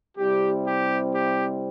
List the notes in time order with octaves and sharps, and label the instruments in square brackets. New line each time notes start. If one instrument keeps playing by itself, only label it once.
[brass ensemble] C3 G3 C4 E4 G4
G4
G4